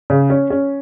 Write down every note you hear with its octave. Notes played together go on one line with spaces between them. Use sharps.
C#3
C#4
C#4